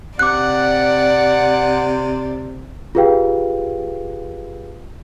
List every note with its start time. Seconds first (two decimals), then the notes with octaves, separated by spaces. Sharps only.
0.19 C3 D5 F#5 D6 F#6
2.95 F4 G4 G#4 B4 F5 G5